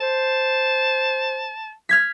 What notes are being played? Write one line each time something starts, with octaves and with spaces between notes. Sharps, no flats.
C5 A5
F6 G#6 B6